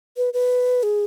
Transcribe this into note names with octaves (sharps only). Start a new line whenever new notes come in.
B4
B4
G#4